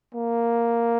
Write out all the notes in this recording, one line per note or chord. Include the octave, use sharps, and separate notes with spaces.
A#3